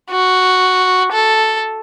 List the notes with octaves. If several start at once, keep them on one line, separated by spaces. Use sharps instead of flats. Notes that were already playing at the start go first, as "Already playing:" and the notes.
F#4
A4